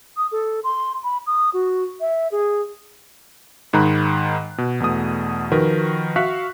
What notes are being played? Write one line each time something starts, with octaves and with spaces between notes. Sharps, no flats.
D#6
A4
C6
B5
D#6
F#4
E5
G#4
G#2 D#3 A#5 B5 F#6
B2
E2 B2 A3 D#6
D#3 F3 F#4 A#4 B4
F#4 E5 F5 C#6 F#6 B6